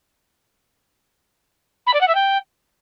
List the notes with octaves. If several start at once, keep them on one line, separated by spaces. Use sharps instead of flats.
B5
D5
F#5
E5
G5